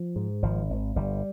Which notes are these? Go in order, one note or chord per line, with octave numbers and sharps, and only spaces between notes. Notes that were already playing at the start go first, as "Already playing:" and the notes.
Already playing: F3
G#2
G#1 F3
G#1
G1 G3